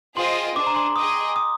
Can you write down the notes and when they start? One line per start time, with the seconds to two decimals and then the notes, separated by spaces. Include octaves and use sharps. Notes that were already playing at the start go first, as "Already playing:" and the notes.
0.16 F4 G#4 C5 D#5 G5 C6
0.56 D4 G#4 C5 D6
0.67 A#5
0.76 C6
0.96 G#4 D#5 G5 D#6
1.36 D#6